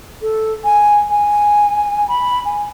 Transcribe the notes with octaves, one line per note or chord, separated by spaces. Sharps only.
A4
G#5
G#5
B5
G#5